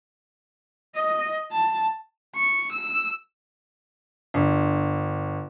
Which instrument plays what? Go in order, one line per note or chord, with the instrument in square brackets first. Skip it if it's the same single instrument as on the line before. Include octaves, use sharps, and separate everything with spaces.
[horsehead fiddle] D#5
A5
[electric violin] C#6
E6
[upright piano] G1